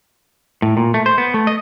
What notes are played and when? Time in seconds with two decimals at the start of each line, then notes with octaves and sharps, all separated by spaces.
0.62 A2
0.77 A#2
0.94 A3
1.06 C5
1.18 B3
1.34 A3
1.47 D#5